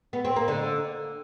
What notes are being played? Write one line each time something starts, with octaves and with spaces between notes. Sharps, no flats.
B3
C4
A#3
D3